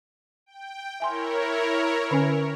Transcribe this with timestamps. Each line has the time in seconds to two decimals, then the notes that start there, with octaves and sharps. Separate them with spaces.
0.46 G5
1.00 E4 A#4 C#5 E5 G#5 C6
2.11 D3 C#4 G#5